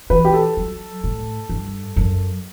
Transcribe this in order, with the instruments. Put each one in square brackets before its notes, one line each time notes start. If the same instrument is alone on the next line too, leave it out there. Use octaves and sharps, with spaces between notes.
[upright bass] E3 [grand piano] B4
[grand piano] G4
A4
[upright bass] F#3
A2
G2
F#2